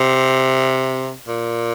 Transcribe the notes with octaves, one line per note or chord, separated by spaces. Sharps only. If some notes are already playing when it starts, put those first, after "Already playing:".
Already playing: C3
A#2